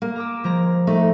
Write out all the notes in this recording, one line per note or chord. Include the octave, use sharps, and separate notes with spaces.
A#3
A#5 D6 E6
F3 G#3 A#5
A3 D#4